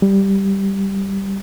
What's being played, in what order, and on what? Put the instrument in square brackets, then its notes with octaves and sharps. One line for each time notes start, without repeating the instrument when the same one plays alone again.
[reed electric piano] G3